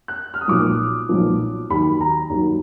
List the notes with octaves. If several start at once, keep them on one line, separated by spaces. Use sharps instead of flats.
F#6
F6
D#6
B1 A#2 F3 D6
B1 A#2 F3
D#2 D#3 F#3 B5
A#5
D#2 D#3 F#3